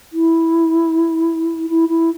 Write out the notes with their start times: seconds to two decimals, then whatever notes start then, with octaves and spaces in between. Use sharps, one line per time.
0.13 E4
1.70 E4
1.89 E4